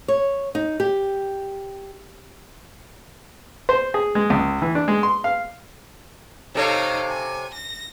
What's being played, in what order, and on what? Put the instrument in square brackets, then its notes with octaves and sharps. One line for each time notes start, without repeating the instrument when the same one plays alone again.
[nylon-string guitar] C#5
D#4
G4
[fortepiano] C5
G#4
G#3
C#2
E3
D4
G#3
C6
F5
[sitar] C3 A4 C#5 [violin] D#4 F5
[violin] G#5
A#6